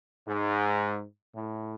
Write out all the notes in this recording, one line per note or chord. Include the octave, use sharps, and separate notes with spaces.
G#2
A2